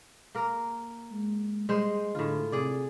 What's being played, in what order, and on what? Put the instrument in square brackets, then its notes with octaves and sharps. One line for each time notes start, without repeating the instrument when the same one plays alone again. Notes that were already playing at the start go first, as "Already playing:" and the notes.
[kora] A#3 A#4
[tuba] G#3
[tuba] G3 [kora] G#3 C5
[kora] A2 F4 [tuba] D3
[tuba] C3 [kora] G#4 D5